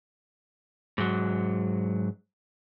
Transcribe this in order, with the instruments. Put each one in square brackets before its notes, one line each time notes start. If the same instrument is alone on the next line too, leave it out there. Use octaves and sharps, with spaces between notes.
[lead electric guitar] G#2 F#3